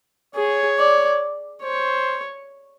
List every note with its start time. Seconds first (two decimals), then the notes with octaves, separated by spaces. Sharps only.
0.35 G#4 C#5
0.78 D5
1.63 C5 C#5